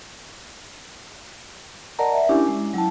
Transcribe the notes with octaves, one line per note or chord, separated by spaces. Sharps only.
A#4 D5 D#5 F#5 A5 A#5
E5
C#4 D4 E4 G4 G#5
G#3
F#3 E4 G5 A5